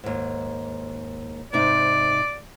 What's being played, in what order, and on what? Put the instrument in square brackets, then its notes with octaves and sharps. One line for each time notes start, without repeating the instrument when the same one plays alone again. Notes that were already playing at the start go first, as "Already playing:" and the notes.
[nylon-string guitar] D#2 G#2
[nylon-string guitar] G#2 C3 D#4 [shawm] D5